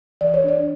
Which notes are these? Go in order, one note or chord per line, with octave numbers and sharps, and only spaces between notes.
E3 D5
C#5
D4 D5